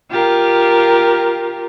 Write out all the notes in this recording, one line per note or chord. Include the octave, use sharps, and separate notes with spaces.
F4 G4 A#4